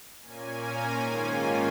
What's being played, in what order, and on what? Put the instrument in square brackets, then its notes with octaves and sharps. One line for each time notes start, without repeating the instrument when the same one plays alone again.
[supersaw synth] A#2 A#3 C#4 G#5
A#5
G#2 D#3 A#3 C#4 F4 G#5